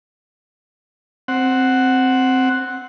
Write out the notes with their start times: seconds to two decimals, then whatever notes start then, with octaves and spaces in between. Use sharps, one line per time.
1.28 C4 F#5